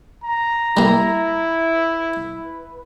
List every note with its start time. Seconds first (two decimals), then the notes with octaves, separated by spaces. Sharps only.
0.24 A#5
0.77 G3 A#3 E4
1.76 B4